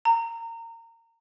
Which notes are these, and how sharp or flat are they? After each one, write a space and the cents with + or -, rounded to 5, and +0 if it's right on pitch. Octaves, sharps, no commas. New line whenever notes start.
A#5 -25